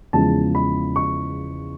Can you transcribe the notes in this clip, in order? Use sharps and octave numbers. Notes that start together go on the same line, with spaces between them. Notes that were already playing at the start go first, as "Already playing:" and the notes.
E2 C#3 F3 G#3 A5
B5
C#6